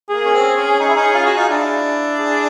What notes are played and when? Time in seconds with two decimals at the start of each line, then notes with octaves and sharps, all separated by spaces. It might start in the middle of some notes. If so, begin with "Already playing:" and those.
0.10 A#3 G#4
0.25 C#4
0.34 C4
0.57 C#4
0.80 D#4
0.88 E4
0.95 C#4 D#4
1.14 F4
1.26 F#4
1.36 D#4 F4
1.49 D4 E4
2.19 G#4